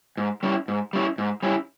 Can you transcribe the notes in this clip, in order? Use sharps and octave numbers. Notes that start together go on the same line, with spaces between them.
G#2
G3 C#4 E4
G#2
G3 C#4 E4
G#2
G3 C#4 E4